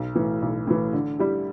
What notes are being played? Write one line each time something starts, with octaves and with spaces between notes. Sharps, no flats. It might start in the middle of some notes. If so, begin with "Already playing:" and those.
Already playing: B1
A2 E3
B1
A2 E3
D3
G3 E4 G4